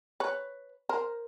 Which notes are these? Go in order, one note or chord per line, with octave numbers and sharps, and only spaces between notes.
B4 C#5
A#4 C5